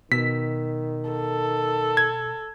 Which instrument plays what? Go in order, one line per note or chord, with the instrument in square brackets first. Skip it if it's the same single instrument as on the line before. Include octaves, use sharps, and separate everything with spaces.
[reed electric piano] B2 E6 [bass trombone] D#3 [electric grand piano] B6
[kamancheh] A4
[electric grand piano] G#6